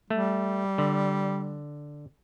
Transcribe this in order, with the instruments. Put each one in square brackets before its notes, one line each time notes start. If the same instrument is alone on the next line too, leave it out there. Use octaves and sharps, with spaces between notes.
[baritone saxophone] G3 [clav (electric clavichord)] A3
[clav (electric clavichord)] D3